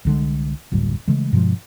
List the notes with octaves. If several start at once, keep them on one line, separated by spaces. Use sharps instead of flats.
C2 D3 G#3
F#1 D2 A2 G3
C#3 E3 G#3 A3
G2 B2 F3 G#3